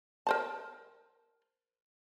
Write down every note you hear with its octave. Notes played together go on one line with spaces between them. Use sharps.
A#4 C5 A5